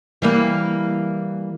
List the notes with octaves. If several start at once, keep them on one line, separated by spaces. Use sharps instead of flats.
E3 G3 A#3